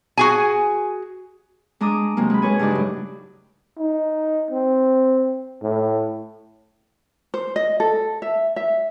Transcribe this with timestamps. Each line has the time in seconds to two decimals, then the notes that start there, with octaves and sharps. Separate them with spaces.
0.17 F#4 G#4 G#5
1.80 G#3 D4 A#5 D6 D#6
2.17 C3 F#3 G#3 A#3
2.30 G#3 B5
2.42 G#4 B4 C#5 G#5
2.59 G2 C#3 D#4 D5 F#6
2.71 A2 F#3
3.79 D#4
4.51 C4
5.62 A2
7.34 C5
7.56 D#5
7.80 A4
8.22 E5
8.56 E5